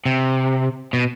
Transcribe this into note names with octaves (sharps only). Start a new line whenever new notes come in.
C3
B2